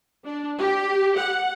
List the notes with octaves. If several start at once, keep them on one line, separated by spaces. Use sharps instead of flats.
D4
G4
F#5